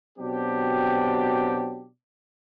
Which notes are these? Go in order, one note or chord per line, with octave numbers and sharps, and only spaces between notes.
B2 F#3 C4 D4 G4